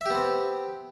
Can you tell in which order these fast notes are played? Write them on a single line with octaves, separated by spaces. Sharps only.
E5 G4 B3 C4